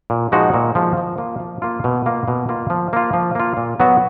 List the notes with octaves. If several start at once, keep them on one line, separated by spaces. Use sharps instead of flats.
A#2
F3 G#3 D#4 F#4
A#2
F3 G#3 D#4 F#4
F3
A#3 F4
F3
A#3 F4
B2
A#3 F4
B2
A#3 F4
F3
A#3 F4
F3
A#3 F4
A#2
F#3 B3 F#4